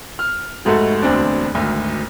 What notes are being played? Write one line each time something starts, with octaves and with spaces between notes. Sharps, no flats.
F6
F1 G#2 A3 F#4 A4
E1 D2 C4 D4
G#1 D2